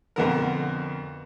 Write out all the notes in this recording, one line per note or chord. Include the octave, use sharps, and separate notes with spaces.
F2 B2 D3 B3 A#4